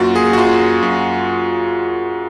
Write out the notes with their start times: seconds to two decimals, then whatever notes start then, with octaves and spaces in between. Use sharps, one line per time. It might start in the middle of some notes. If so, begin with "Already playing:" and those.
Already playing: F#2 A#3 F4 F#4
0.15 G#4
0.33 F#4
0.38 F#2 F4
0.82 F#2